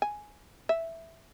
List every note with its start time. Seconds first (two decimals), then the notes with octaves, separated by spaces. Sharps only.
0.02 G#5
0.69 E5